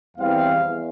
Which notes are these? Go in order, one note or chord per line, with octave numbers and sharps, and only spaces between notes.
E2 E3 G3 C4 F5
E2